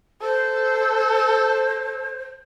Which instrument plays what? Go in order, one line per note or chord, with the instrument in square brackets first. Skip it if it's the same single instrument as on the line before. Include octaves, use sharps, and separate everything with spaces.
[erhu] A4 [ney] C5